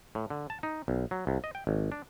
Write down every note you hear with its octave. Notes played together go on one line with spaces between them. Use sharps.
A2
D3
A5
D#4
B1
F#3
C2
D#5
G5
G#1
D4